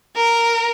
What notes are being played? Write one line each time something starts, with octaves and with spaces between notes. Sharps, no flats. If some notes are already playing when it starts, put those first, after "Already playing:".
A#4